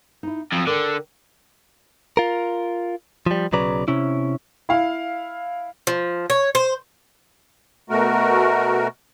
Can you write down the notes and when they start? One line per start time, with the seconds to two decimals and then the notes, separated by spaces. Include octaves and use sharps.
0.23 D#4 E4
0.52 F2 F#3
0.67 D3 A#4 G5
2.17 F4 A#4
3.26 F3 G3
3.52 B1 C#3 F#3 B4 D5 A#5
3.88 C3 C#4 E4
4.69 E4 F5
5.87 F3
6.30 C#5
6.55 C5
7.90 B2 A3 F#4 A#4